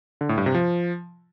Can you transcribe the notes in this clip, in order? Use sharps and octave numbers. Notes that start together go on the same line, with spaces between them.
D3
A2
G2
C3
F3